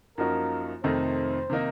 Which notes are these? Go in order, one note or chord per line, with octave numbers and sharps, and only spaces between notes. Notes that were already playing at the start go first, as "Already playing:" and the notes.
F#2 F3 A#3 D#4 F#4 A#4
F2 C3 D#3 A3 D#4 C5
C3 D#3 A#3 D#4